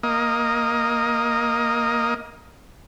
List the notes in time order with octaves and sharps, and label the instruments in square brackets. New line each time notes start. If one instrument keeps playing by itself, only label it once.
[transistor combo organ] A#3 D#5